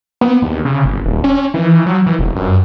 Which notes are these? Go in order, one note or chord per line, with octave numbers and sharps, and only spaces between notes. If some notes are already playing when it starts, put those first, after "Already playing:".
B3
D#2
C#3
G1
D#1
C#4
E3
F#3
E3
E1
F#2